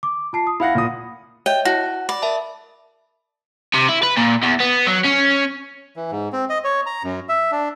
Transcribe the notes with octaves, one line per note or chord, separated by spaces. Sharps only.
D6
F4 A5 C7
D#6
E4 F5 F#5 B5 A#6
A#2 D#6
C#5 D#5 E5 G5
E4 F#4 A5
D5 B5
A#4 E5 A5
C3
E4
B4
A#2
E2
B3
F#3
C#4
E3
G#2
C4
D#5
C#5
A#5
F#2
E5
D4